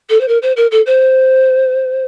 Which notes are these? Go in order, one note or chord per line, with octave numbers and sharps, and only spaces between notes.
A4
C5
A#4
C5
A#4
A4
C5